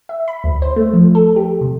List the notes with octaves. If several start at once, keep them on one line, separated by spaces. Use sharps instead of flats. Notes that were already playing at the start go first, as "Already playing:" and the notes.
E5
B5
D2
C5
A3
F3
A4
G4
C3